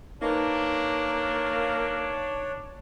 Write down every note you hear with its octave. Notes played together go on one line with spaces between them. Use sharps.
A#3 D4 D#4 B4 C#5